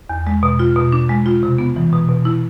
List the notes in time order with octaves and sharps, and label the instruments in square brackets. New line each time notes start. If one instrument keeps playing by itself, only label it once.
[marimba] E2
G#3
B2
F4
B2
D4
G#3
F4
C3
B3
E3
B2
B2
E4